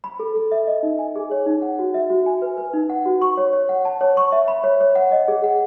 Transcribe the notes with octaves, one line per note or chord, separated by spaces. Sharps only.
B5
A4
A4
E5
D#5
D#4
G#5
G#4
C#5
D#4
F#5
F#4
E5
F#4
G#5
B4
B4
D#4
F#5
F#4
C#6
C#5
C#5
F#5
A5
C#5
C#6
E5
B5
C#5
C#5
F#5
D#5
G#4
F#5